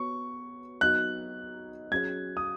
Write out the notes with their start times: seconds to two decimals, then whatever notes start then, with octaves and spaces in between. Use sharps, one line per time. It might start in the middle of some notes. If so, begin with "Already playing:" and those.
Already playing: B3 F#4 C#5 C#6
0.81 F#3 B3 D#4 F#4 D#5 F#6
1.91 F#3 C#4 G#4 C#5 G#6
2.37 D#6